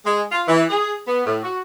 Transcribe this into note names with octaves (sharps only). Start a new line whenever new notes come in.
G#3
F4
E3
G#4
B3
A2
F#4